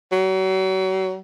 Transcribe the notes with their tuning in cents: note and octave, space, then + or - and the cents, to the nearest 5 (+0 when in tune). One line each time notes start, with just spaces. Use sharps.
F#3 +35